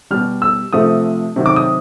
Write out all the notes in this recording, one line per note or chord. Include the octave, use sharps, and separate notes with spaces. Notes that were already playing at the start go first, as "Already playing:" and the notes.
B2 G3 F6
E6
C3 F3 A3 D#6
C3 D#3 F#3
D6
D#6